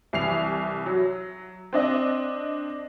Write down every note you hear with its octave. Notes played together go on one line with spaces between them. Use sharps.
C2 E3 C7 F7
F#3
C4 D4 D#5